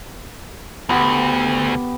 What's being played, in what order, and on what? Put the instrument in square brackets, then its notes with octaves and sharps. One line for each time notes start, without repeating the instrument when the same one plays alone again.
[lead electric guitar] D2 [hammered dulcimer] B3 G4